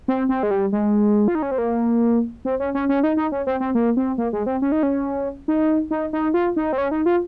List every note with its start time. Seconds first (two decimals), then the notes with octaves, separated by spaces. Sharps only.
0.08 C4
0.29 C4
0.43 G#3
0.51 G3
0.72 G#3
1.28 F4
1.35 D#4
1.42 C#4
1.51 C4
1.58 A#3
2.45 C4
2.60 C#4
2.75 C#4
2.89 C#4
3.03 D#4
3.17 D#4
3.32 C#4
3.47 C4
3.60 C4
3.75 A#3
3.97 C4
4.18 A#3
4.33 G#3
4.46 C4
4.62 C#4
4.72 D#4
4.83 C#4
5.48 D#4
5.91 D#4
6.13 D#4
6.34 F4
6.56 D#4
6.73 C4
6.78 C#4
6.91 D#4
7.06 F4